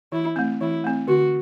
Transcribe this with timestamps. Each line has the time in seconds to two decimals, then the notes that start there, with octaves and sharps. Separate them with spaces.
0.12 E3 E4
0.36 A3 C4
0.61 E3 E4
0.84 A3 C4
1.08 D3 F#4